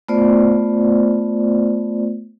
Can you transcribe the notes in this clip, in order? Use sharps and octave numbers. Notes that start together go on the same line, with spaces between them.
A3 B3 F4 C5 D5